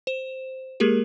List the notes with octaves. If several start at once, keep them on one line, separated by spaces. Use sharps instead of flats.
C5 E7
G#3 A#3 G4 G#4 A#4